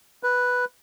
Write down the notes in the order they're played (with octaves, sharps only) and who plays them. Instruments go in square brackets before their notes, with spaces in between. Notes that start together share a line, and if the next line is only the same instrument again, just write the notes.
[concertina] B4